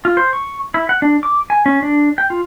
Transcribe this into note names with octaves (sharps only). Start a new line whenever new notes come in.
F4
C5
C#6
E4
F#5
D4
D6
G#5
C#4
D4
G5
F4